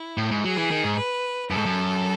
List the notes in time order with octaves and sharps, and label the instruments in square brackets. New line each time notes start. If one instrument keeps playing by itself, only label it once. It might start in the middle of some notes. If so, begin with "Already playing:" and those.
Already playing: [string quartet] E4
[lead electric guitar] A2
G#2
[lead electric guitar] F#3 [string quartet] G#4
[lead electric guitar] E3
D#3
G#2
[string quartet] B4
[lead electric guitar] F#2 [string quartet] A4
[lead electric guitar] G#2
F#2